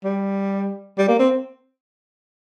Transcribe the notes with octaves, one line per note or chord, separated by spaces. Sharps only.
G3
G3
A#3
C4